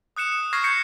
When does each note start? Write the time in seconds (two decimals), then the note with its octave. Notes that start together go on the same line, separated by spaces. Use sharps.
0.17 D#6 F#6 C#7 E7
0.53 C#6 F6 G#6 A#6 C7
0.64 G6 G#6 A#6 C7 C#7